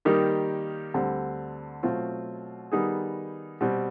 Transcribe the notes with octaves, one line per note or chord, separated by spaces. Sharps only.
D#3 G3 A#3 D#4 G4
D2 D3 G3 C4
B2 F#3 A3 C4 F4
D#3 G3 B3 D#4 G#4
B2 G3 C4